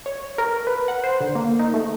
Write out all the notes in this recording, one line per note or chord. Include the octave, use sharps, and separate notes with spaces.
C#5
A#4
B4
F#5
C5
D3
A#3
D#4
A3